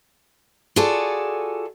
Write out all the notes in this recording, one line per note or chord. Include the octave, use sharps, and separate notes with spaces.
F4 F#4 G#4 A4 D5